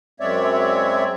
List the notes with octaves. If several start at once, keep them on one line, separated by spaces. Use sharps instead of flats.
F#2 G#3 C4 C#5 D5 E5